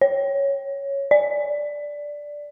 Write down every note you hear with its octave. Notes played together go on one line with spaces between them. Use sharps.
C#5
D5